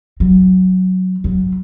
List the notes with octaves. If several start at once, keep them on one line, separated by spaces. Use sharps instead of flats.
F#3
F#3